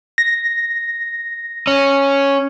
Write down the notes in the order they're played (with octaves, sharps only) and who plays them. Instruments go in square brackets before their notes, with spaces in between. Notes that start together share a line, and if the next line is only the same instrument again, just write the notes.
[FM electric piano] A#6
[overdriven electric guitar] C#4